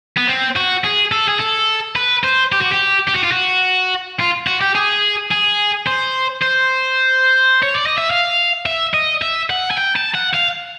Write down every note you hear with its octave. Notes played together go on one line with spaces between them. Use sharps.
B3
C4
F#4
G#4
A4
G#4
A4
B4
C5
G4
F#4
G4
G4
F#4
F4
F#4
F4
F#4
G4
G#4
G#4
C5
C5
C#5
D5
D#5
E5
F5
E5
D#5
E5
F#5
G#5
G5
A5
F#5
F5